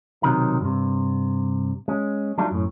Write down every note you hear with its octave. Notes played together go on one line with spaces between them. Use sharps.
B1 C3 D#3 F#3 A#5
G2 C3
G#3 C#4
F#3 G3 A3 D4 D#4 F4
F#2 A2